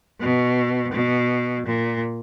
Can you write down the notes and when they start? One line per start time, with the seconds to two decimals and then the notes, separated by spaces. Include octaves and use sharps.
0.20 B2
0.92 B2
1.66 A#2